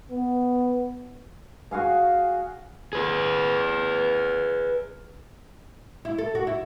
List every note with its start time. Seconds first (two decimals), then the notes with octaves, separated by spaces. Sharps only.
0.11 B3
1.71 F#4 G#4 F5 G#5
2.93 G#4 B4
6.05 E4
6.18 A4
6.35 F#4
6.47 E4